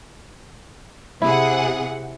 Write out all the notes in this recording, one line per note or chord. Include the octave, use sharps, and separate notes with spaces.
C3 E4 G#4 F#5